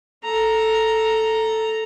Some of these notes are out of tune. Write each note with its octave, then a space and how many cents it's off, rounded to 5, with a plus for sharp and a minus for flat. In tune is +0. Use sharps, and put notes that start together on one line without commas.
A4 +0 A#5 +0